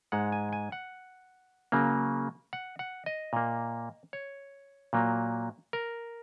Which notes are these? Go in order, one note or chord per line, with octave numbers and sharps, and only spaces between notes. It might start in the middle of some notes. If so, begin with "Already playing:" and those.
G#2 G#3 F#5
G#5
G#5
F#5
C#3 F#3 A#3
F#5
F#5
D#5
A#2 A#3
C#5
A#2 F#3 A#3
A#4